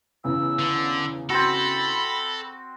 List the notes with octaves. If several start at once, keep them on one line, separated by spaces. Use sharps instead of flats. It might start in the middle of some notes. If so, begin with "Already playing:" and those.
E2 C#3 E3 E6
D3
C4 F#4 A4 B5